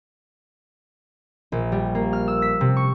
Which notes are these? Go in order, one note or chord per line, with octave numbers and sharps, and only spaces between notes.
A#1
G3
A#3
F6
E6
B6
C3
C#6